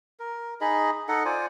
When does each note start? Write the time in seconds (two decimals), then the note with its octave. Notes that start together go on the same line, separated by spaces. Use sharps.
0.20 A#4
0.61 D#4 G#4 D#5 B5
1.09 D#4 A4 D#5 F#5
1.25 F4 C5 D5 G#5